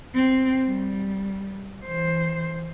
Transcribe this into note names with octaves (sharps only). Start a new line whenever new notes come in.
C4
G3
E3 C5